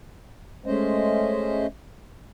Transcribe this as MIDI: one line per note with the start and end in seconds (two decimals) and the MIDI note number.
0.66 1.67 56
0.66 1.67 57
0.66 1.67 61
0.66 1.67 72
0.66 1.67 75